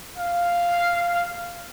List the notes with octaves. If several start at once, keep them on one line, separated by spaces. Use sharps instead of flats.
F5